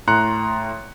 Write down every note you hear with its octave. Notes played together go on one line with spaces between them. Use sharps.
A2 A#5 C6 F#6 C#7